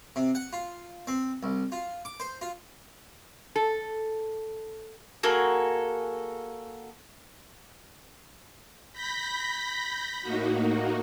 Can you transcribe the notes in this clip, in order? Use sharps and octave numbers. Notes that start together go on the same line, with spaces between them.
C3
F#5
F4
C4
C2
F4
D6
C5
F4
A4
A#3 F#4 G#4 A4
B5 G6 A#6 B6
A2 A#3 D#4 F#4